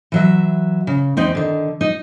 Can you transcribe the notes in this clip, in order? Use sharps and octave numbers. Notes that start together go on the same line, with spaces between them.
E3 F#3 E5
C#3
E2 C4 D#4
D3 D#3
D#4 D#5